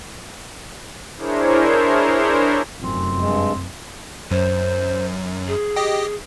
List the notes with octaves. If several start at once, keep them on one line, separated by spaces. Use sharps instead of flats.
D4 E4 G#4 A#4 C5 C#5
F1 F#2 C4
G2 G#3
F#2 C5
G#4
G4 D#5